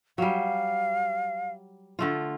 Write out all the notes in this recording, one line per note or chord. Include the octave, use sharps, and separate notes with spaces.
F#3 G3 F5
D3 A3 F4